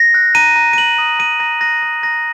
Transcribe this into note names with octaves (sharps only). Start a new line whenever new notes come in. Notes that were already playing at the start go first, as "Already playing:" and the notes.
Already playing: A#6
F#6
A#5 D#7
A#5
D#7
F#6 F#7
D#6
A#5 D#7
A#5 A#6
F#6 A#6
D#6 A#6
A#5 A#6